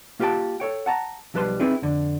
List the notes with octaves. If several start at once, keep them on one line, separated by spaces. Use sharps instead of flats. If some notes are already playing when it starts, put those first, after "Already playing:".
A#3 F4 G4 A#4 G5 A5
A4 C#5 G5
F#5 A5 A#5
B1 F3 G3 B4 A5 C6
C4 D#4 E4 G#4 B4
F2 D3